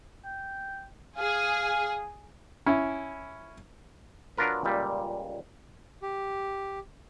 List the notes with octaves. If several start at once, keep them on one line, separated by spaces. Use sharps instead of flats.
G5
G#4 F5
C#4 E4
F#3 D4 F4 A#4 B4
C#2 A#2 G3
G4